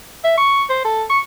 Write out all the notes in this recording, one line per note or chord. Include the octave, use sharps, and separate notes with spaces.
E5
C#6
C5
A4
C#6